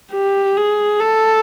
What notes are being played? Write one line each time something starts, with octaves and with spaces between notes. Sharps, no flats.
G4
G#4
A4